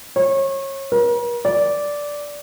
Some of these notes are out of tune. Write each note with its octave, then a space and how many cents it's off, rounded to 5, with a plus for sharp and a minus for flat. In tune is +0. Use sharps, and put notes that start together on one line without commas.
C#5 -30
A#4 +45
D5 -10